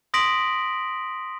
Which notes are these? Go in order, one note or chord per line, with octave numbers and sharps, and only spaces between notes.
C6 D#6 A#6 B6 D7 F#7